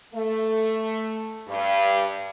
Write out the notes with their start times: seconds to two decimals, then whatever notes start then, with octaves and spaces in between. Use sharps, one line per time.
0.14 A3
1.47 G2